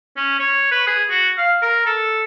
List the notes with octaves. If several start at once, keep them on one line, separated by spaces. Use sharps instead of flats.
C#4
C#5
B4
G#4
F#4
F5
A#4
A4